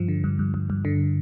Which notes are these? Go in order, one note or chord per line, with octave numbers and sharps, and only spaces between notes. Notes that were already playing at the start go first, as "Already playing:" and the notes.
Already playing: G2 F3
D3
G2
G2
G2
G2
D3